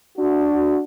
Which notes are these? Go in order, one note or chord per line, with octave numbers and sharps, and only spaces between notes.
D4 F#4